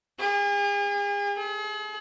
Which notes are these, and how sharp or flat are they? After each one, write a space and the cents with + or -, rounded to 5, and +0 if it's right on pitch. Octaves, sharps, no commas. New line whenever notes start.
G#4 -40
G#4 +40